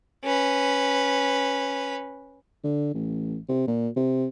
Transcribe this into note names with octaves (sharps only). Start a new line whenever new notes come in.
C#4 B4
D3
A1
C3
A#2
C3